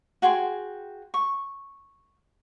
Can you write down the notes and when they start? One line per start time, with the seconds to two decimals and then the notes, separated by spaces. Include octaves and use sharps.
0.22 F#4 G#4 G5 C6
1.14 C#6